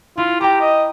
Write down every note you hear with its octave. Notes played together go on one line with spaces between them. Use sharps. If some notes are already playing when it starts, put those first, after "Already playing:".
E4 F4
G4 G5 A#5
D#5